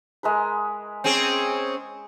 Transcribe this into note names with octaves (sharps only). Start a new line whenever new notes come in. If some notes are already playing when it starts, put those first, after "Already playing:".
G#3 A#4 B4
C4 C#4 G#4